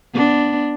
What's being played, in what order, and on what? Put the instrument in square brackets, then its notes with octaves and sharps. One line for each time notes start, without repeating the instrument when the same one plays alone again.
[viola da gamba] B3 D4